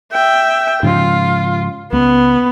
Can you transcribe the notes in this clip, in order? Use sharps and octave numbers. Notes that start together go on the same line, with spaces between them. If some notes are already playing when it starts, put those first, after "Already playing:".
E5 G5
G#2 C#3 F3 F4
C#2 B3